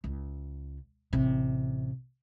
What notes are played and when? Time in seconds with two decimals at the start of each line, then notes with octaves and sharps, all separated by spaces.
0.04 C#2
1.13 A1 C3